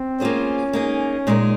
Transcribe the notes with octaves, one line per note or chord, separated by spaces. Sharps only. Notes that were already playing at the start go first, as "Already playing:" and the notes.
Already playing: C4
A#3 C#4 F4 G#4 C5
A#3 D#4 G#4
A#2 G#3 D#4 A#4